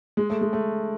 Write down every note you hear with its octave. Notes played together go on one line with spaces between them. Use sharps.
G#3
A3
G#3
A3